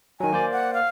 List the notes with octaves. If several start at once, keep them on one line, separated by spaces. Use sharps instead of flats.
D#3 F#3 G#5
A#3 C5 D5
F#5
F5